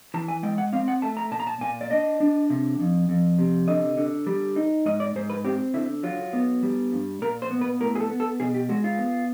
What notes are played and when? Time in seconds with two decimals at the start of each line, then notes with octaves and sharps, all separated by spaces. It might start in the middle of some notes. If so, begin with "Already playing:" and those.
0.14 E3 A5
0.28 G#5
0.43 G#3 G5
0.58 F#5
0.73 C4 F5
0.88 F#5
1.02 A3 A5
1.17 A#5
1.31 A#2 A5
1.40 A#5
1.47 A5
1.61 A#2 G#5
1.81 D5
1.91 D4 D#5
2.20 D4
2.50 C3
2.79 F2
3.09 F2
3.39 C3
3.68 D3 D#5
3.97 D3
4.27 G3
4.56 D#4
4.86 G#2 D#5
5.00 D5
5.15 G#2 C5
5.30 B4
5.44 C4 G4
5.74 D3 E4
6.03 F#3 F4
6.33 B3
6.63 G3
6.93 G2
7.22 A#2 A#4
7.42 C5
7.51 B3
7.61 B4
7.81 A2 A#4
7.95 G#4
8.00 A4
8.10 B3
8.20 A4
8.40 B2 G#4
8.54 G4
8.69 G#3 F#4
8.84 F4
8.98 B3